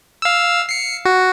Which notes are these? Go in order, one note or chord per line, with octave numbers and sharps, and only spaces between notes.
F5 E6
C7 C#7
F#4